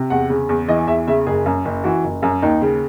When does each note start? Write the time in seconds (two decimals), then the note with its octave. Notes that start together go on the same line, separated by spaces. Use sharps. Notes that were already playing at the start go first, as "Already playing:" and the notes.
Already playing: C3
0.10 E2 F#5
0.30 C#3
0.49 E2
0.68 E3 D#5
0.87 E2 E5
1.07 C#3 E5
1.26 F#1 G#4
1.46 F#2
1.65 F#1
1.84 E3 F#4
2.04 F#1
2.22 F#2
2.42 D#2 D#4
2.62 C#3